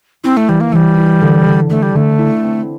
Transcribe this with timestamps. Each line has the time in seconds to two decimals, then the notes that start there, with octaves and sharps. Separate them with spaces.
0.24 C4 E4
0.37 A3
0.48 E3 G3
0.60 A#3
0.72 E3 G3 A3
0.98 E4
1.21 D3
1.46 D3
1.70 D3 A3
1.82 G3
1.94 D3 A3
2.19 E4
2.43 C4